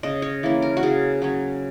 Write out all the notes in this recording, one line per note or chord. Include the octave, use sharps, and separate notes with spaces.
C#3 D#5
C#5
E3 A#3 C#4
A#4
F#4
C#3 G#4
F#3 C#4